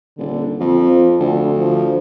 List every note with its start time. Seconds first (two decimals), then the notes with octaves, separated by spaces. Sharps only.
0.18 D#1 D3
0.60 F2 F3
1.20 D2 D3
1.57 F3